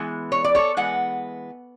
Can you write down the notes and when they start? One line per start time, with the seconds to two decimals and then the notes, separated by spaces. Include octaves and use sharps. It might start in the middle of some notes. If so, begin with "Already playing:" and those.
Already playing: E3 G#3 B3
0.32 C#5
0.44 D5
0.55 A4 C#5
0.77 E3 G#3 B3 F#5